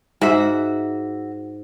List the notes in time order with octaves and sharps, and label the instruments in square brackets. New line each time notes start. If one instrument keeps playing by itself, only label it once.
[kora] G#2 [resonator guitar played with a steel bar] F#4 E5